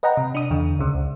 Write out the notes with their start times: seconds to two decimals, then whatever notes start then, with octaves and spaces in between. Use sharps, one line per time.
0.03 B4 D#5 F#5 G5 A#5
0.17 C3
0.35 D4 D#6
0.50 E2 D3
0.79 C#2 C#3
0.94 C#2